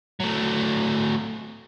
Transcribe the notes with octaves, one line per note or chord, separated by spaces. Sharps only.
F#3 A3